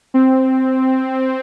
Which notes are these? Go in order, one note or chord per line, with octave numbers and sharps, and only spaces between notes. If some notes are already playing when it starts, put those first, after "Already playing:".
C4